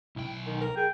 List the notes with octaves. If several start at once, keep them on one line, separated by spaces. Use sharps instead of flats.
B1 E4 G5
D#3
A#4
G#4 G5